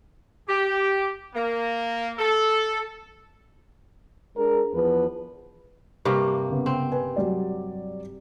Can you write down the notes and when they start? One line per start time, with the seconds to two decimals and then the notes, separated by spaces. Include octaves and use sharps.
0.49 G4
1.35 A#3
2.18 A4
4.37 G#3 D4 A#4
4.74 E2 F3 B3 B4
6.05 G2 C3 A#3
6.50 C#3 B3
6.66 C4
6.92 B4 G#5
7.16 F#3 G3 D5